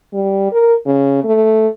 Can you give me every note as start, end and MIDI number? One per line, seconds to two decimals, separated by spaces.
0.14 0.50 55
0.52 0.74 70
0.86 1.19 49
1.24 1.68 57